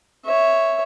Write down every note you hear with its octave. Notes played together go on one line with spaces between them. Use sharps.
C#5 E5